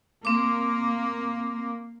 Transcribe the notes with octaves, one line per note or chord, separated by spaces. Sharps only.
A#3 C4 D6